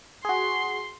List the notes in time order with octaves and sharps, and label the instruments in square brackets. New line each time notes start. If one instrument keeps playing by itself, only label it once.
[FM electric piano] F#4 G#4 [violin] C6